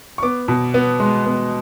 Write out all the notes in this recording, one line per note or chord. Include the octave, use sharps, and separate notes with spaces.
C#6
B3 D6
B2
B3
G#3
B3